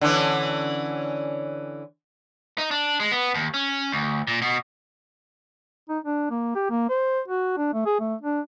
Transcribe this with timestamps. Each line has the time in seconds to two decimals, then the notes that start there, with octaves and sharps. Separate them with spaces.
0.01 D3 E3 C#4
2.58 D#4
2.71 D4
3.00 G#3
3.11 B3
3.34 D#2
3.54 C#4
3.92 D2
4.27 A#2
4.42 B2
5.89 D#4
6.05 D4
6.30 A#3
6.55 G4
6.70 A#3
6.89 C5
7.28 F#4
7.57 D4
7.74 A3
7.86 G#4
8.00 A3
8.21 D4